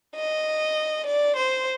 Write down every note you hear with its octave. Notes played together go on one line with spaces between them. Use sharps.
D#5
D5
C5